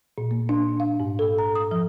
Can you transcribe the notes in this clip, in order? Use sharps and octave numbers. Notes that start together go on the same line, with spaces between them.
A#2
A#3
D4
F5
G#2
A4
A#5
D#6
F3